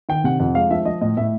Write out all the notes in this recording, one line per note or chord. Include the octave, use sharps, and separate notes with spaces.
D#3 G5
C3 F#5
F2 F#5
G#3 F5
F3 E5
F3 D#5
A2 D#5
A2 E5